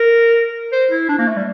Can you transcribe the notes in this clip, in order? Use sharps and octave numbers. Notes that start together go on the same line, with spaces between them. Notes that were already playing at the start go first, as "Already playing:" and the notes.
Already playing: A#4
C5
E4
D4
A#3
A3
G3